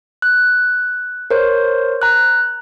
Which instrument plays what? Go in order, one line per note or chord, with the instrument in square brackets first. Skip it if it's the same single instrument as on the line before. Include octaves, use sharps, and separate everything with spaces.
[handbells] F#6
A#4 C5 C#5
A#5 F#6